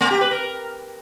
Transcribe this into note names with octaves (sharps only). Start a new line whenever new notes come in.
A3
G4
B4
A#4